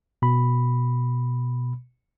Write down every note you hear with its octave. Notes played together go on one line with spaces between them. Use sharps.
B2 B5